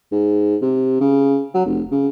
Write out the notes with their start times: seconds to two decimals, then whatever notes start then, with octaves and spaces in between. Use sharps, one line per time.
0.12 G#2
0.62 C3
1.00 C#3
1.54 F#3
1.65 F1
1.91 C#3